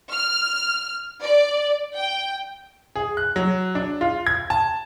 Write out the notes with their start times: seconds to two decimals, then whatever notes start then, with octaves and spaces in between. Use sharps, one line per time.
0.12 F6
1.23 D5
1.97 G5
2.96 G#4
3.17 F#6
3.36 F#3
3.75 D4
4.01 F4
4.27 G#6
4.50 A5